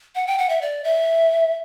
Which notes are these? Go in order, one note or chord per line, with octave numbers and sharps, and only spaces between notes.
F#5
G5
F#5
E5
D5
E5